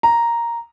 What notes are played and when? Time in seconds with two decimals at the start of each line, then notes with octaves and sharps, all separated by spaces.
0.03 A#5